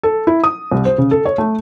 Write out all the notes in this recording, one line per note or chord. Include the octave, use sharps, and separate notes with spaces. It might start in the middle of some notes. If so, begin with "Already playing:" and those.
A4
E4
D#6
C2
C5
C#3
A4
C#5
A3